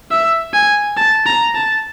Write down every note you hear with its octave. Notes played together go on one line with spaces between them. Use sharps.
E5
G#5
A5
A#5
A5